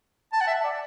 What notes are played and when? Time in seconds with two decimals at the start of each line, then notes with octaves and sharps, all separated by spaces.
0.33 A5
0.41 F#5
0.47 E5
0.64 D5